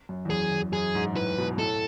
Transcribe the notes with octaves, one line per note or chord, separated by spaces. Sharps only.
F#2
E2
F#2 G#4
E2
F#2 G#4
G#2
A2 B4
B2
A2 A4